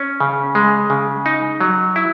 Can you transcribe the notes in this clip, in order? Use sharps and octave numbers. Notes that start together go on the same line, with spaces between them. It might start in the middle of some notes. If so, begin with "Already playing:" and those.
Already playing: C#4
C#3
G#3
C#3
D#4
F#3
E4